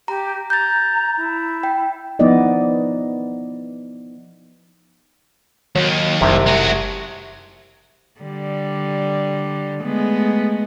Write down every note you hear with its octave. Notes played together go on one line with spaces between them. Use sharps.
G4 A#5
A#5 G6 A6
E4
G5
F3 B3 D#4 E4 D5 D#5
D#2 D#3 F#3
F#1 C2 C3
G#3 F#4
D3 G3
G#3 A3 B3